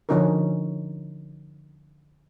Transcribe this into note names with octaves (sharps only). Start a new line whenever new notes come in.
D3 F3 C#4 D#4 F#4 A#4